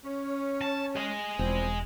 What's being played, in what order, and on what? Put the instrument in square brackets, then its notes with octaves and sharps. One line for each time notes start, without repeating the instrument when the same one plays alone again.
[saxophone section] C#4
[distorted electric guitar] A5
G#4 D#5
[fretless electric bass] E1 [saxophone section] F3 G3 C4